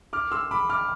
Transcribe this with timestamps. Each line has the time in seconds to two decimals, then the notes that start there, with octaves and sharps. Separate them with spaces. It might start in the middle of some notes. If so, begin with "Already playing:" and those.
0.13 D6 F6
0.32 C6 E6
0.51 B5 D6
0.70 D6 F6